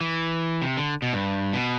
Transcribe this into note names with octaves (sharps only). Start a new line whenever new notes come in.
E3
C3
D3
B2
G2
B2